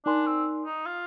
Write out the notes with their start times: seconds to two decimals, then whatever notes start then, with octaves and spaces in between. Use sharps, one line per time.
0.05 D4 D#4 A#4 D5 G#5 C6
0.26 C4
0.65 D#4
0.86 F4